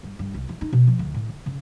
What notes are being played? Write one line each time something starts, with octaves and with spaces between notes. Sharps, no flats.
G2
G2
C2
E3
D#4
B2
F3
D2
A2
D3
C#3